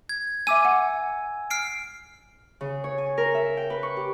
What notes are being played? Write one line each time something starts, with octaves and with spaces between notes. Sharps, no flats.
G#6
E5 G#5 D6 E6 D#7
F#5
F6 C7 D7
C#3
C#5
G#5
A#4
E5
G5
B4
C#6
G4